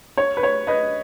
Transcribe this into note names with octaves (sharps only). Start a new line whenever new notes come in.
C#5
B4
C#5
B4 D#5